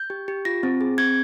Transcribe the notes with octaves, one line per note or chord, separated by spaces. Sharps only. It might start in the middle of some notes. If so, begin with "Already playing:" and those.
Already playing: G6
G4
G4
F4 A#6
C4
G#4
C4 G#6